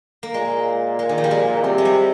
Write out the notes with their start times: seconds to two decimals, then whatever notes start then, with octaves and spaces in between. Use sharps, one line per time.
0.23 A#3
0.34 A#2 G#3
0.99 G#3
1.09 D#3
1.18 F3
1.24 G3
1.31 G#3
1.63 C3 G3
1.78 G#3
1.85 G3